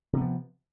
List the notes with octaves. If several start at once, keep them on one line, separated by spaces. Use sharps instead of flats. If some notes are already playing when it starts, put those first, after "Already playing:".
C3 F3 B3